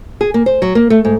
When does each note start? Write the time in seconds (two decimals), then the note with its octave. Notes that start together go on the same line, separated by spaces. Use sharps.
0.21 G#4
0.34 A#3
0.46 C5
0.62 F#3
0.75 A#3
0.90 A3
1.05 G#2